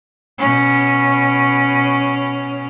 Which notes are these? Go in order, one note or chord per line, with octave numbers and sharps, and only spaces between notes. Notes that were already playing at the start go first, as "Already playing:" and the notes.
B2 C#4